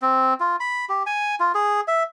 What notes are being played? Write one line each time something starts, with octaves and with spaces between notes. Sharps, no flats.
C4
F4
B5
G4
G#5
F4
G#4
E5